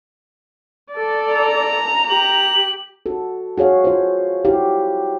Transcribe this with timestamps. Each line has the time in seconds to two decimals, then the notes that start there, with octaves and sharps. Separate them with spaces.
0.93 A4 D5
1.33 A#5
2.10 G4 F#7
3.06 F#4 A4
3.58 F#4 G#4 C#5 F5
3.84 F4 F#4 C5
4.44 E4 F#4 G4 F5